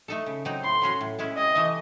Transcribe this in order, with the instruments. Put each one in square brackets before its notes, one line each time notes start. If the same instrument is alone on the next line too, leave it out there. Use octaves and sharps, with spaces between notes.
[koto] A3 D#4 A4
C#3
F#3 C4 D#4
[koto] A2 [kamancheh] C6
[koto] F#3 C#4 F#4
A2
G#3 C#4 E4
[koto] C3 [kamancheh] D#5
[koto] E3 A3